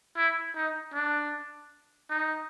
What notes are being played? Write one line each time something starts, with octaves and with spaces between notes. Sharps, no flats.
E4
D#4
D4
D#4